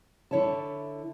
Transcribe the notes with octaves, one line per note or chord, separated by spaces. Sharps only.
D3 E4 C#5 E5 A5